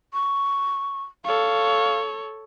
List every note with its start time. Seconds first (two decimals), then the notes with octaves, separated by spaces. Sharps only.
0.13 C#6
1.25 A4 C#5 F5